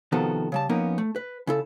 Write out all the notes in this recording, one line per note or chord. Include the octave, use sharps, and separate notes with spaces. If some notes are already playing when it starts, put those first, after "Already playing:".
C3 D#3 F3 B3 F#4 A4
C#3 G3 A5
F3 A#3 B3 C#4 D#4 A#4
A3
B4
C#3 E4 A4